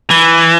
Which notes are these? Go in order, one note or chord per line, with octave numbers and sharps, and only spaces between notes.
E3